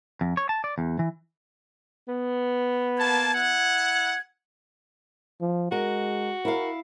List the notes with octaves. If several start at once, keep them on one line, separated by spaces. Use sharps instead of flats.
F2
C#5
A5
D5
E2
E3
B3
A#3 A5 G#6
E4 F#5
F3
G#3 F#4 A#4
E4 A#4 F5